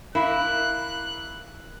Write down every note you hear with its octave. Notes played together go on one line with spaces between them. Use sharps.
A#3 E4 B5 F#6